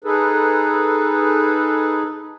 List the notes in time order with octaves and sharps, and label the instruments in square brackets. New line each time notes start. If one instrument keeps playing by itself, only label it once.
[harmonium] D#4 G#4 A4 B4